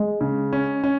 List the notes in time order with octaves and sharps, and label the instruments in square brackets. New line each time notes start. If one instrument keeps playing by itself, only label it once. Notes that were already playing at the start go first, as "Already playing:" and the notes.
Already playing: [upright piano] G#3
[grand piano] C#3
C#4
C#4